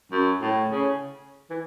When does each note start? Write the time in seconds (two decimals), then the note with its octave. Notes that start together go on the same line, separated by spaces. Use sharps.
0.12 F#2
0.41 A2
0.69 C#3
1.50 E3